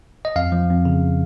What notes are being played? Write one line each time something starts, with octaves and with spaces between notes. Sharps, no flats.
D#5
F2 F5
F3
F2
C#3